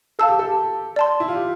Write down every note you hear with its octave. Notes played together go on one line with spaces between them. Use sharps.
A4 F5 A5 E6
G4
A4
G4
D5 A5 C6
E4
F4
G4